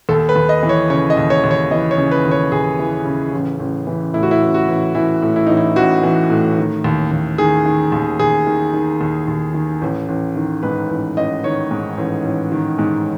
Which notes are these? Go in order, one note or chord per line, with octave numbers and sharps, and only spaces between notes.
D#2 A4
B4
D#2
D#5
E3
C#5
C#3 C#5
D#5
D#2
C#5
D#2
C#5
E3 D#5
C#5
C#3
B4
D#2
C#5
D#2 G#4
E3
C#3
A1
A1
E3
A2 E4
F#4
E4
A1
F#4
A1
E3 E4
A2
E4
A1 D#4
E4
A1 F#4
E3
A2
D#3
D#2
D#2
D#3 G#4
D#3
D#2
D#2 G#4
D#3
D#3
D#2
D#2
D#3
A1
A1
D#3
G#2 B4
A1
A1 D#5
D#3 C#5
G#2
A1
A1
D#3
G#2